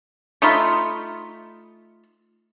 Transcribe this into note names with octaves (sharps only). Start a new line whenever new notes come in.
A3 D#4 F4 B5